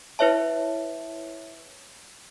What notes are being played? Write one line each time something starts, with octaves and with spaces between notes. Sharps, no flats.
E4 B4 C#5 E5 A5